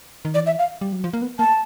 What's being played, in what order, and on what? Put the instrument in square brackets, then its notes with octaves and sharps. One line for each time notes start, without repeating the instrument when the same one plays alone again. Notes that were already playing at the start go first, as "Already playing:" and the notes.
[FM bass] D#3
[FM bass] E3 [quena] D5
[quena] E5
F5
[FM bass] G3
F#3
F3
A#3
B3
[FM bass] A#3 [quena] A5